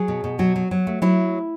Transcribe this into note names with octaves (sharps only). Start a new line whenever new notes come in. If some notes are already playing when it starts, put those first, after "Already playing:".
Already playing: F#3 G#4
B2
B2
F#3 F#4
F#3
F#3
A3
F#3 E4